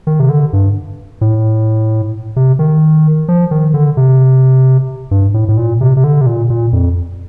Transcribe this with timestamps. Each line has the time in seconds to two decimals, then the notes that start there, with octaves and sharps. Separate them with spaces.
0.07 D#3
0.20 C3
0.29 D3
0.53 G2
1.21 A2
2.36 C3
2.59 D#3
3.28 F3
3.51 D#3
3.74 D3
3.97 C3
5.11 G2
5.34 A2
5.48 A2
5.57 A#2
5.81 C3
5.97 C3
6.04 D3
6.21 C3
6.26 A#2
6.50 A#2
6.73 F2